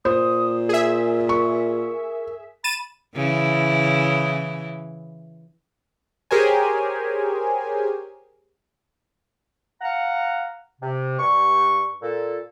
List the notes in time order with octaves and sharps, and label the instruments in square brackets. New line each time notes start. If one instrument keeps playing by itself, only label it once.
[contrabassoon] A#2 [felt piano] C5 [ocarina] D#6
[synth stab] G#4 E5 [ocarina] A#4
[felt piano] C#6
[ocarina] B5 [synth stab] A6 D#7 E7
[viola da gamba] C#3 E3 E4
[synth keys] G4 G#4 A#4 C5 C#5 G#5
[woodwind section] F5 F#5 A#5
C3
G2 C#6
A#2 A4